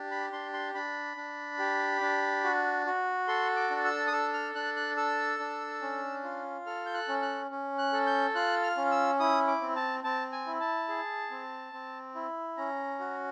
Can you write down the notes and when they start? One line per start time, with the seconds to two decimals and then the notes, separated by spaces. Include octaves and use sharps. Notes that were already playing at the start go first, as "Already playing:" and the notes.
Already playing: D4 G4
0.11 B5
0.33 D4 C6
0.53 C6
0.74 D4 B5
1.17 D4
1.59 G4
2.01 D4
2.44 F#4
2.86 F#4
3.28 A4 C6
3.56 D6
3.70 D4
3.85 E6
4.07 D#6
4.12 A4 E6
4.34 F6
4.55 D4 F#6
4.76 F#6
4.97 A4 E6
5.39 D4
5.82 C#4
6.24 F4
6.66 A4 F6
6.86 G6
6.94 F#6
7.08 C#4
7.22 F#6
7.51 C#4
7.78 F#6
7.93 A4
8.07 G6
8.35 F4 F#6
8.63 F6
8.77 C#4
8.91 E6
9.20 E4 D#6
9.48 D6
9.62 C4
9.76 A5
10.04 C4 A5
10.32 G#5
10.46 E4
10.61 A5
10.88 G#4
11.31 C4
11.73 C4
12.15 E4
12.57 C#4 A#5
13.00 F#4